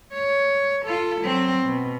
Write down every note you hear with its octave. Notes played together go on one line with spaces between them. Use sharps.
C#5
F4 A4
F#3 C4
B2